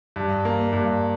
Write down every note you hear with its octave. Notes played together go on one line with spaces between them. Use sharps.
G2
A#3
G2